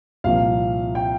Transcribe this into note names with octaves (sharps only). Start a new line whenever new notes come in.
C2 A#2 F3 F5
G5